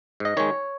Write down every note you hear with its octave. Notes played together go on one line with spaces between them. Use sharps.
G#2 D#5
D#3 G#3 C#5